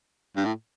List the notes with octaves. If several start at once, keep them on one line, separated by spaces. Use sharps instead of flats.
G2
A2